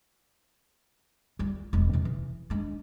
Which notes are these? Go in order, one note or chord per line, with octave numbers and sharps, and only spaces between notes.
G3 F4
E1 G#3
C3 E3
E3
G#3 D4